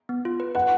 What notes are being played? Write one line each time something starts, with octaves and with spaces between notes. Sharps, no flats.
B3
F4
B4
B4 F#5